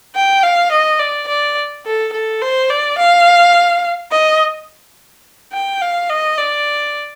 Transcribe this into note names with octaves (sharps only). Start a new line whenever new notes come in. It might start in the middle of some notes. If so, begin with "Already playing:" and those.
G5
F5
D#5
D5
D5
A4
A4
C5
D5
F5
D#5
G5
F5
D#5
D5